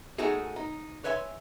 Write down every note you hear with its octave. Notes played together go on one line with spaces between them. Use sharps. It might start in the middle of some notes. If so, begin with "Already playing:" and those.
A#2 G#3 A3 D#4 F#4 G#4
D#4
B4 C#5 E5 G#5 C6